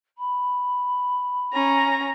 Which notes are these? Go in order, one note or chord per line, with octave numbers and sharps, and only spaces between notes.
B5
C#4 A#5